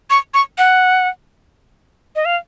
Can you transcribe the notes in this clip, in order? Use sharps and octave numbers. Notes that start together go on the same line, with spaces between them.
C#6
C#6
F#5
D#5
F5